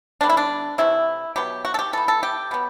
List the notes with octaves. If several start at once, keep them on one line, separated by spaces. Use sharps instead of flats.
D3 G3 B3 D4
E4
D4
C3 E3 A3 E4
B2 F#3 B3 G4
F#4
A4
G4
E3 B3 A4
A4
G4
B2 F#3 B3